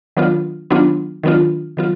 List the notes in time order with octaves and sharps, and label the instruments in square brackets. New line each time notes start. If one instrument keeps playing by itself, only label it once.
[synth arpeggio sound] D#3 F#3 B3 D4 F4
D#3 F#3 B3 D4 F4
D#3 F#3 B3 D4 F4
D#3 F#3 B3 F4